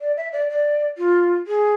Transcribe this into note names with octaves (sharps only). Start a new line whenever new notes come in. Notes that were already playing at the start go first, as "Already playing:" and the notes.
D5
E5
D5
D5
F4
G#4